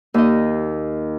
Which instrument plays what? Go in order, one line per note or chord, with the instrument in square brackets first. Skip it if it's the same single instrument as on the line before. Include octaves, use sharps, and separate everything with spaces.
[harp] D#2 D#5